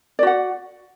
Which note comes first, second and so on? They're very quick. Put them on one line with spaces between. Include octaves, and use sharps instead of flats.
D5 F#4 F#5